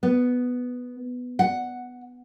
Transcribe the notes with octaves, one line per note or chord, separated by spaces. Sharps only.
B3
F#5